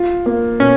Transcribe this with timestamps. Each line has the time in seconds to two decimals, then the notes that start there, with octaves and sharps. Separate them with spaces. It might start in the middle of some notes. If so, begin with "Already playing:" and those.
Already playing: F4
0.26 A#3
0.60 B2 C#4